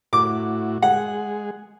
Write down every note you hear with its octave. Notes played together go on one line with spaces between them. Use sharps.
A2 E4 F#4 D6
G#3 G#4 F#5